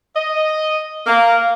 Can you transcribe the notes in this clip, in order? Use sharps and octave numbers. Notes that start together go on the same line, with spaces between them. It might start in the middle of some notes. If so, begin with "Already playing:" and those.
D#5
A#3